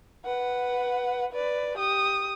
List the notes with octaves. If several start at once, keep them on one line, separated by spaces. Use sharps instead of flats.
B4 F#5
B4 D5
G4 D#6